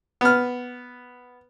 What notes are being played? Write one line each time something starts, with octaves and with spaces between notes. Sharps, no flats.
B3 F6